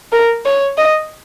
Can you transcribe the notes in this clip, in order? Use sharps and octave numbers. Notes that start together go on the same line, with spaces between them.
A#4
C#5
D#5